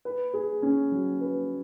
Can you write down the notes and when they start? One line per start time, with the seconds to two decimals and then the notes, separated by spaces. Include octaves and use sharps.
0.05 B4
0.34 G#4
0.62 C#4
0.91 F#3
1.21 B4